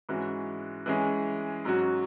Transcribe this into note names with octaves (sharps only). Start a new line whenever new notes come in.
G#2 E3 G#3 C#4 F#4
E3 G#3 C#4 G#4
G#2 F#3 C#4 F#4